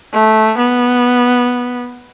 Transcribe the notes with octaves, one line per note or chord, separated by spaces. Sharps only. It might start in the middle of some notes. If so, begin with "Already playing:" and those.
A3
B3